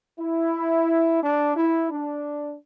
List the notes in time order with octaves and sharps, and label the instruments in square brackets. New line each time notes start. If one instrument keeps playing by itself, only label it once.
[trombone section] E4
D4
E4
D4